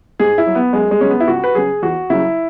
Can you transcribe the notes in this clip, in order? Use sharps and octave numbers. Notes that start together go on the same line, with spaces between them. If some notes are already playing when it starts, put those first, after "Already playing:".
G#2 G#4
E4
F#3
B3
F#2 G#3
G#3
C#3 F#3 C#4
B3
E4
C#2 F#4
B4
C#3 F#3 G#4
E2 F#4
C#3 F#3 E4